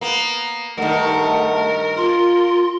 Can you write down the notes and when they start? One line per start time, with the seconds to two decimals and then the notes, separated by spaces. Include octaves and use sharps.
0.01 A#3 B3
0.78 G2 D#3 A3 A#4 F#5
1.97 F4 C6